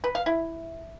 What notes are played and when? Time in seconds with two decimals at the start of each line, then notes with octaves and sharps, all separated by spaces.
0.04 B4
0.15 F5
0.26 E4